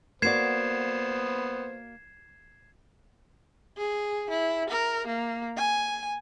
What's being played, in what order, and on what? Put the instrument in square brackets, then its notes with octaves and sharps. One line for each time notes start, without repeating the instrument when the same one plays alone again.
[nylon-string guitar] A#3 F#4 D5 [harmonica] B3 C5 [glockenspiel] G#6 C7 E7
[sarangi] G#4
E4
A#4
A#3
G#5